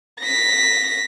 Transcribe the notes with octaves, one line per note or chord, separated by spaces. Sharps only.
A#6 B6